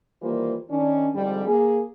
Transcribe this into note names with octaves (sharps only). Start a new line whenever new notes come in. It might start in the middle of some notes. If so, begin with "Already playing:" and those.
D#3 E3 G3 A#3 F4 C5
D#3 C#4 D4
F2 G#2 D3 G3
A#3 G#4